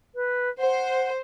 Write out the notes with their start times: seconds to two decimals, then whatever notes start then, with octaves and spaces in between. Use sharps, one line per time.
0.15 B4
0.59 C5 F#5